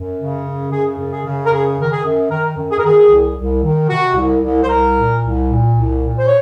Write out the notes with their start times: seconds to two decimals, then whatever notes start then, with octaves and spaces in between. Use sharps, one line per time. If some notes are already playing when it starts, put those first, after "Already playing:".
Already playing: F#2
0.20 C#3
0.47 F#2
0.72 C#3 G#4
0.99 F#2
1.12 G#4
1.25 C#3
1.46 A#4
1.52 F#2 G#4
1.79 D#3 A#4
1.92 G#4
2.05 F#2
2.31 D#3 A#4
2.58 F#2
2.71 G#4
2.78 A#4
2.84 D#3 G#4
3.10 C2
3.36 C2
3.63 D#3
3.89 C3 F#4
4.16 C2
4.42 C2
4.63 C5
4.68 C2 A#4
4.95 A#2
5.21 C2
5.48 A#2
5.73 C2
6.00 A#2
6.18 C5
6.26 C#5